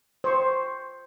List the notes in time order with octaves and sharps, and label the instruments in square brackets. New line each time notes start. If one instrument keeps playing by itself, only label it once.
[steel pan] C5 C#6